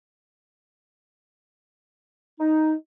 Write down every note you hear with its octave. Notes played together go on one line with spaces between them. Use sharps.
D#4